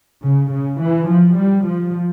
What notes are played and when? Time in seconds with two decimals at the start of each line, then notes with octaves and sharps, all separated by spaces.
0.23 C#3
0.52 C#3
0.80 E3
1.08 F3
1.36 G3
1.65 F3